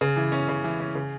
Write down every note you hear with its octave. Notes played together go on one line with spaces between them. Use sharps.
C#3
E3
C#4
C#3
E3
C#4
C#3